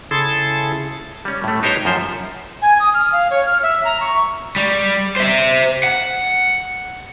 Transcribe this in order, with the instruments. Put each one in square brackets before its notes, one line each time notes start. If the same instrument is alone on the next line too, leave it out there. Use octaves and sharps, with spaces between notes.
[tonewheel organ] C#3 E4 G#4 A4 A5 C6
[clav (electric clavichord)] G3 C#4
A2 A3
B3 D#4 G4 C5 C#5 A#5
F#2 F3 C5 E5
[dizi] G#5
D#6
F6
F5
C#5
F6
E5
A#5
C#6
[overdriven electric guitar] G3
C5 E5
F#5